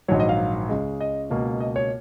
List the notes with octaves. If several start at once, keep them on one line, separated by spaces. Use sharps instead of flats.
A#1 G#2 D#3 F#3 C#5
D#5
F5
C#2 C#3 G#3
D#5
C#2 B2 A#3
D#5
C#5